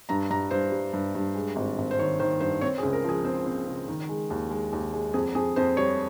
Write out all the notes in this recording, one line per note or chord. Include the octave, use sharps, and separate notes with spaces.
G2 A#5
G2 A#5
G2 C5
G3
G2
G2
G#3
G#1
G#1
C5
D#3 C#5
D#3 C5
G2 C5
C4 C#5
G#4
C#2
A#4
F3 G#4
C4 C5
C4
C#3
D#3
G#3
D#2
G#3
D#2
G#3
F2 G#4
F2 G#4
F2 C5
G3 C#5